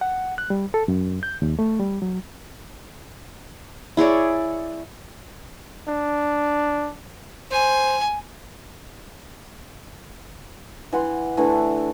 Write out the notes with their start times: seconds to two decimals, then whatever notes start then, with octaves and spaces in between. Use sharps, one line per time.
0.01 F#5
0.38 F#6
0.50 G3
0.74 A4
0.88 F#2
1.23 G6
1.42 D#2
1.59 A3
1.80 G3
2.02 F#3
3.97 E4 G#4 C#5 D5
5.88 D4
7.51 C5 G#5
10.93 E3 F#5 C6
11.37 D3 E3 A3